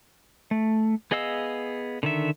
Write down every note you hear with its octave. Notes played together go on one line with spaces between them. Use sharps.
A3
B3 G#4 D#5 F5 E6
D3 D#3 E5